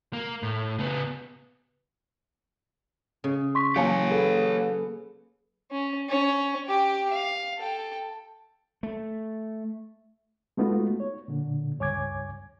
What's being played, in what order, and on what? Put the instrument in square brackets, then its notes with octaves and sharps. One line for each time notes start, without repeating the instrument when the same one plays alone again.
[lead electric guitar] A#3
A2
C#3 B3
[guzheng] C#3
[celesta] C6 C#6 B6
[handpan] F#3 A#3 [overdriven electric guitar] G4 C#5 [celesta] F5 G#5 A5
[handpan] G#4 A4 B4
[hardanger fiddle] C#4
C#4 C#5
G4 G5
F5
A4 G5
[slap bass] A3
[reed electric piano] G#3 A3 B3 D#4 F4 F#4
C#5
A#2 D3
C#2 G2 C#5 G#5 D6 G#6